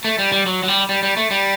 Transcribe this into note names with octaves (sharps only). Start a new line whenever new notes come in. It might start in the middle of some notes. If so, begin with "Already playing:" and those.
A3
G3
G3
F#3
F#3
G3
G3
G3
A3
G3